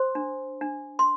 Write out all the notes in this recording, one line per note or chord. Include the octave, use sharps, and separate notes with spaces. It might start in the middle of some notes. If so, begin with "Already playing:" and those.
Already playing: C5 C6
D4
D4
C6